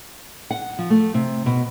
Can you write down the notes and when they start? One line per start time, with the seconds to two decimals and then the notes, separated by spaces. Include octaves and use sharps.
0.51 F#5
0.79 F3
0.90 A3
1.14 C3
1.46 B2